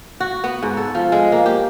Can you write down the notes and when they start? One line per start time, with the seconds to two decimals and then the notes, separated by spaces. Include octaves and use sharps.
0.20 F#4
0.44 B3
0.63 G#2
0.77 A4
0.95 F3
1.12 G#3
1.32 A#3
1.46 G4